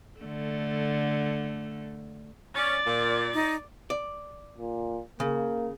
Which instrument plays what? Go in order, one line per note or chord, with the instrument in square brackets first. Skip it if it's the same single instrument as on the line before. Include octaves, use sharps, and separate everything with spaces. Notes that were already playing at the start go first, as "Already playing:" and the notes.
[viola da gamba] D3 A3
[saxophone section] C#4 [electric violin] D5 A6
[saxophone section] A#2
[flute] D#4
[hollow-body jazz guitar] D5
[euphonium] A#2
[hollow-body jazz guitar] C#3 [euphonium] A#3